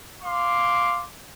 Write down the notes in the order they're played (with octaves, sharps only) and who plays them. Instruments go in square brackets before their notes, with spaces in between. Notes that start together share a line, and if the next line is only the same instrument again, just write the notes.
[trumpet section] F5 C6 D6